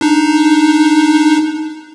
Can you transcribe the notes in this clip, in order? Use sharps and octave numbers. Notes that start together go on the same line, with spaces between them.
D4 D#4